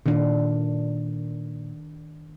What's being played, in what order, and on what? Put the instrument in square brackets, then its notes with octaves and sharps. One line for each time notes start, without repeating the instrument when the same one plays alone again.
[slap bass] A#2 [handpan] D#3 D4